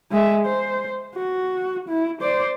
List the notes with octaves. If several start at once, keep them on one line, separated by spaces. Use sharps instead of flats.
G#3 E5
C5
F#4
E4
C5 D5